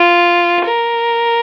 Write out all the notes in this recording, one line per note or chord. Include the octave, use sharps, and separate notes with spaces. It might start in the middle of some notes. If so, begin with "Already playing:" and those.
Already playing: F4
A#4